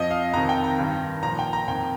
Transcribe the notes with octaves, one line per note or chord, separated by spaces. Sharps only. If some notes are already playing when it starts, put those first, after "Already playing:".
Already playing: F2 F3 D#5
F5
F2 C3 D#3 A#5
G5
A#5
G2 D#3
A#2 F3 A#5
G5
A#5
F2 D#3 G5